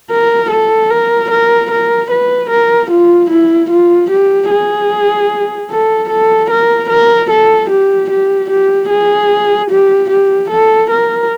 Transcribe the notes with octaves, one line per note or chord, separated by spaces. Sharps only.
A#4
A4
A#4
A#4
A#4
B4
A#4
F4
E4
F4
G4
G#4
A4
A4
A#4
A#4
A4
G4
G4
G4
G#4
G4
G4
A4
A#4